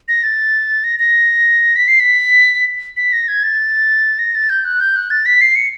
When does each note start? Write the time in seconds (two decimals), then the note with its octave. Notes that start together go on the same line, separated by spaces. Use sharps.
0.08 A#6
0.23 A6
0.84 A#6
0.99 A#6
1.76 B6
1.88 C7
2.00 B6
2.97 B6
3.13 A#6
3.28 G#6
3.43 A6
4.19 A#6
4.35 A6
4.50 G6
4.65 F#6
4.80 G6
4.96 F#6
5.10 A6
5.26 B6
5.41 C7
5.56 C#7